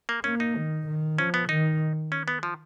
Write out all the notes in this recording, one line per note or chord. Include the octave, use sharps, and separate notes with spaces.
A#3
A#3 C#4
D#4
D#3
D#3
F3 C#4
B3
D#3 D#4
C#4
B3
F3